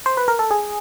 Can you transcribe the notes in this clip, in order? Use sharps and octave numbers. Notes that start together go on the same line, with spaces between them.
C5
B4
A#4
A4
G#4